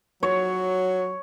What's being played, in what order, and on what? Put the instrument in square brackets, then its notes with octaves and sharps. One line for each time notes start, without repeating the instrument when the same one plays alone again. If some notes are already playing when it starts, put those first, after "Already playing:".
[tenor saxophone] F#3 [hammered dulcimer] C#5